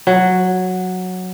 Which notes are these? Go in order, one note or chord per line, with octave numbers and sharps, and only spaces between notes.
F#3